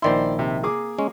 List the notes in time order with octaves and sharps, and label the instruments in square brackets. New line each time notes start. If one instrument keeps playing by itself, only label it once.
[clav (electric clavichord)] A#1 D#3 E4 [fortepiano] C5 D5 C6
[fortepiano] C3
A#3 G#4 D6
[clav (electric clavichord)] G#3 C#4